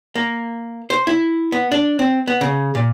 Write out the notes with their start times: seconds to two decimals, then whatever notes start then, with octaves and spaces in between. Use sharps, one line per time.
0.16 A#3
0.90 C5
1.07 E4
1.52 B3
1.72 D4
1.99 C4
2.28 B3
2.41 C#3
2.75 A#2